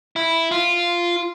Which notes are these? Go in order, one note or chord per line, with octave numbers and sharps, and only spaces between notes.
E4
F4